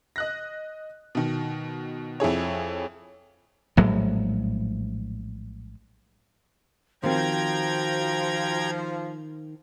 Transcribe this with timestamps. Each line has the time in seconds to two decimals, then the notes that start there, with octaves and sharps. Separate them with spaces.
0.16 D#5 F#6 A#6
1.15 B2 D#3
2.20 F2 E4 G#4 C#5
3.77 A#1 A2 F#3 G#3
7.03 D#3 F3 C4 F#4 G5 A#5 G#6